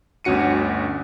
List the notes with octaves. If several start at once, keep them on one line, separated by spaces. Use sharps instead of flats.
G1 D2 C#4 F#4 C#7 D#7